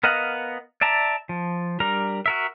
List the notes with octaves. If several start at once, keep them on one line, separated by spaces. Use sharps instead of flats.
B3 A#4 D#5 F5 F#5
D5 E5 A5 A#5
F3
G3 D4 A#4 A#5
F#4 A#4 E5